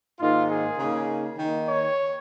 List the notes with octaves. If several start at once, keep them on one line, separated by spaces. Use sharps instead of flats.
G#2 D#3 A#3 D#4 F4
G#4
C#3 A#3 D#4
D#3 A#3 D#4
C#5